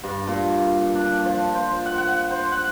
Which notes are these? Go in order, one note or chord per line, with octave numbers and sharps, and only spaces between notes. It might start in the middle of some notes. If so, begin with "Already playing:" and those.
G2
A#2
D4
F3
C5
F#5
F#5
C5
F#5